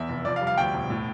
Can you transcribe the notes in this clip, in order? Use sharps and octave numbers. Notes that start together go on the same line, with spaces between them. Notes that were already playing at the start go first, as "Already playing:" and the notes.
Already playing: E2 E5
F1
F2 D5
F5
G3
F5
D2 G5
E1
A2